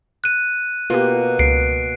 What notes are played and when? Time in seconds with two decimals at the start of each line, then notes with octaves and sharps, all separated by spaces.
0.24 F#6 D#7
0.90 B2 A#3 F4 G4
1.39 C#2 C7 D7